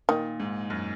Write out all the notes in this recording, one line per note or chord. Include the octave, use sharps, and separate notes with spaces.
A#2 D#3
G#2
F#2